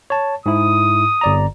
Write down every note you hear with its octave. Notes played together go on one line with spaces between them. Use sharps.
C#5 A5
G#2 E4 D#6
G1 D5 A#5